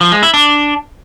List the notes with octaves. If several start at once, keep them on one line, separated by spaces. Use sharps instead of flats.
F3
G#3
E4
D4